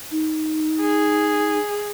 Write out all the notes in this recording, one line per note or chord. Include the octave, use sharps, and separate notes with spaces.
D#4
G#4